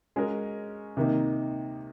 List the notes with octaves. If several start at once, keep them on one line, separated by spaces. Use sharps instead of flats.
G#3 C#4 F#4 A#4
C3 D#3 A#3 D#4